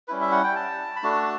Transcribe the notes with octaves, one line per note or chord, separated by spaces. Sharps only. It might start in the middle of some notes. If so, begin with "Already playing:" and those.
G3 C#4 E4 B4
E5
F#5
G5
A5
B5
A3 D4 F#4 A5